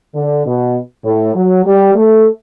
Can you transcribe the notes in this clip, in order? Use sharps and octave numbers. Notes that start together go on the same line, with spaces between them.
D3
B2
A2
F#3
G3
A3